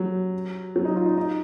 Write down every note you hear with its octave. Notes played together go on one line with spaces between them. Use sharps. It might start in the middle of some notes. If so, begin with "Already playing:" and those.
Already playing: F#3
F#3
D#4
F4
D#4
D#4